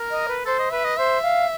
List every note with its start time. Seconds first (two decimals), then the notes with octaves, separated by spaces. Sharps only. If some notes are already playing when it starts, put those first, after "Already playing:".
Already playing: A#4
0.11 D#5
0.28 B4
0.45 A4 C5
0.59 D#5
0.71 B4 E5
0.84 D#5
0.97 C5 E5
1.22 F5